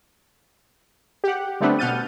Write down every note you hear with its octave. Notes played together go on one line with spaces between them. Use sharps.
G4 F#5
D3 G3 A3 B3 C4 D4
B2 F#5 F6 G6 A6 D#7